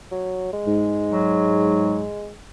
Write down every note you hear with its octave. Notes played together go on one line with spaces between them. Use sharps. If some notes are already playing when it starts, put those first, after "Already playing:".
F#3
G#3
G#2
F#3